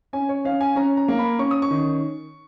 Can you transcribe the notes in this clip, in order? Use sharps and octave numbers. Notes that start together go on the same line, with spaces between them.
C#4 G#5
C#5
C#4 F5
G#5
C#4 A#5
A#5
A#3
B5
C#4 C#6
D#6
C#6
D#3